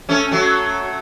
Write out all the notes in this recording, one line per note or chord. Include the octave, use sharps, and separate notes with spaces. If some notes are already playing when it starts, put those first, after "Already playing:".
A3 C#4
F#3 A3